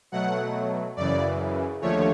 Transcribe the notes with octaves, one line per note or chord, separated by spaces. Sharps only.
B2 F#3 A3 F#5
F#2 C#3 E3 D5
D#2 D3 F3 A3 C#5